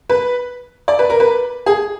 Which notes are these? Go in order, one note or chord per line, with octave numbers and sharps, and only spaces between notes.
B4
D5
B4
A#4
B4
G#4